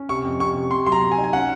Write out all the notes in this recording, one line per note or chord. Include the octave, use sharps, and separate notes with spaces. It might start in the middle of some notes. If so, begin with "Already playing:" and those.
Already playing: C#4
C3 C#6
F2
C3 C#6
C3
C3 C6
F#3 C6
A#5
C4
G#5
D#4
G#5
C#4 F#5